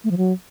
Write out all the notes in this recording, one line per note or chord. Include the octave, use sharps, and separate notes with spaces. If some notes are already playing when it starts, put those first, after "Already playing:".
A3
F3
F#3